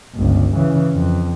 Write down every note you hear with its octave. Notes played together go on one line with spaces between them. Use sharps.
G1 C#2
C#3 E3
F2